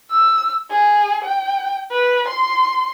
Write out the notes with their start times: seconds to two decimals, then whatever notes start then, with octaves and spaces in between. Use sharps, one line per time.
0.12 E6
0.71 G#4
1.24 G5
1.92 B4
2.28 C6